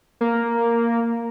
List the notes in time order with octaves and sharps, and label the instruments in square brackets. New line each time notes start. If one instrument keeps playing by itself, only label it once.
[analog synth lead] A#3